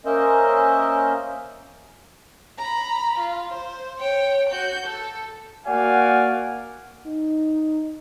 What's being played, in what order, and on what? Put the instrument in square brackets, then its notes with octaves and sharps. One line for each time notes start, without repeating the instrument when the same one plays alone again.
[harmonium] A#3 C#4 A#4 C5 D#5 E5
[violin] A#5 B5
F4
C5
C#5 G5
F#4 G6
A4
[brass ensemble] A#3 F#4 D5 F5 F#5 G#5
[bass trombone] D#4